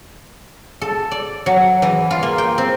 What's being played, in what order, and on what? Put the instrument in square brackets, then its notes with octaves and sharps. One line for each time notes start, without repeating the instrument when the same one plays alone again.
[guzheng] A4
D5
F#3
E3
F4
A#3
G5
C4